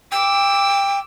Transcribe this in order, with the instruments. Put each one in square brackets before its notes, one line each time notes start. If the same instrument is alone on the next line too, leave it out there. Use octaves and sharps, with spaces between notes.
[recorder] G5 [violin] D6 E6